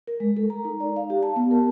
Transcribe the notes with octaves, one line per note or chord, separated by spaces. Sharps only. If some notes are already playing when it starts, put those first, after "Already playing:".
A#4
G#3
A4
A#5
D#4
D5
F5
G4
A5
B3
A#4